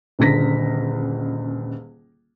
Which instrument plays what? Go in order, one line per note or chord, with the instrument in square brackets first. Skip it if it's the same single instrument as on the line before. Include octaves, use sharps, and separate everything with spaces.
[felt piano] D#1 C#2 D3 A#6 B6